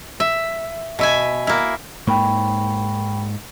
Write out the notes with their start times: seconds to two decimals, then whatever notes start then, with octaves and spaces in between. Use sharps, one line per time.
0.20 E5
0.99 B2 E5 G#5
1.47 A#3 E4
2.07 G#2 A#3 G5 B5 C#6